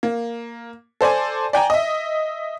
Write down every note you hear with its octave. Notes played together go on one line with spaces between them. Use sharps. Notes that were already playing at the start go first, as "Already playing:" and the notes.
A#3
A4 C5 D5 G#5
D5 G5 G#5 A#5
D#5 E5